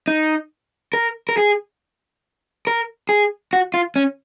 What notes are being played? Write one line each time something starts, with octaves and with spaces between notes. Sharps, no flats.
D#4
A#4
A#4
G#4
A#4
G#4
F#4
F4
C#4